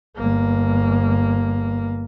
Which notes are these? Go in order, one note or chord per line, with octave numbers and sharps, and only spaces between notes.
G1 A#3